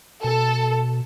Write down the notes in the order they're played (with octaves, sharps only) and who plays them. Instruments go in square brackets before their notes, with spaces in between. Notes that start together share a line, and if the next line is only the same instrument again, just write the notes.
[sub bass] B2 [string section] A4